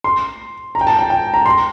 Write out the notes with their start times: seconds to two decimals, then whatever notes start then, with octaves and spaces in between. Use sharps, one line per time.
0.04 C6
0.75 A#5
0.81 G5
0.87 A5
0.99 G5
1.10 G5
1.34 A#5
1.46 C6